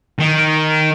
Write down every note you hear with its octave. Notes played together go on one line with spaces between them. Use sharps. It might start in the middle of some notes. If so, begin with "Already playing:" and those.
D#3